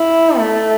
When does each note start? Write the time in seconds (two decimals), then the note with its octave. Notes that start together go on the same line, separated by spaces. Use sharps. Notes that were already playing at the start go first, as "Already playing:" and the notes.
Already playing: E4
0.38 A3